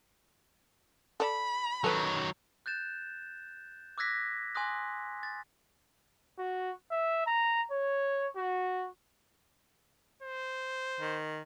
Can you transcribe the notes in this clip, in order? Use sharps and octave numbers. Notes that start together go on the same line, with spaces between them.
A4 D5 B5
D#3 F#3 A4 B4
F#6 G6 A6 E7
D6 E6 F#6 G#6 A#6 B6
G#5 C6 D6 D#6 F#6 A#6
A6
F#4
E5
A#5
C#5
F#4
C5
D#3